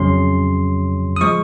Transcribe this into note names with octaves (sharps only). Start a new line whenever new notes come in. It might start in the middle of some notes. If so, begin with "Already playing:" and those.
Already playing: F2 C#3 F#3 C#4 C6
D#6
F3 G#3 C#6